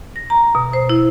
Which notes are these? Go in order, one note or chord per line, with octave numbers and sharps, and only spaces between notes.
A#6
A#5
B2
C5
E4